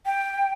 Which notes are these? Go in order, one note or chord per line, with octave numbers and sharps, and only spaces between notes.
G5